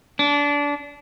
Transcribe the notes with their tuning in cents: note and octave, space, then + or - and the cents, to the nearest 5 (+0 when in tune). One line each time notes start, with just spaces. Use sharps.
D4 -25